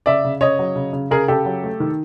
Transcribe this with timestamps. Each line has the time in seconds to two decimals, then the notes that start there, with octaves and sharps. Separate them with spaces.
0.06 C#3 D5 E5
0.24 C#3
0.41 C#3 C#5 D#5
0.59 F#3
0.76 C#3
0.93 C#3
1.11 C#3 G#4 A#4
1.28 C#3 G4 A4
1.45 F#3
1.64 A3
1.80 D#3